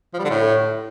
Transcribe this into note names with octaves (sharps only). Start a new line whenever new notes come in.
F3
G3
D3
A2